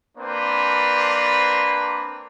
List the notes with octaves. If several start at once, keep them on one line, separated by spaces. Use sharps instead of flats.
A#3 C4 D4 B4 C5